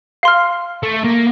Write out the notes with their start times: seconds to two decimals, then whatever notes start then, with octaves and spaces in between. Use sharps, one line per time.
0.23 F5 C6 F6
0.83 A3
1.04 A#3